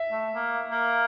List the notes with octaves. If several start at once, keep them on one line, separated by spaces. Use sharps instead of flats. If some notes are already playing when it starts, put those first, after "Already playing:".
Already playing: E5
A3
A#3
A#3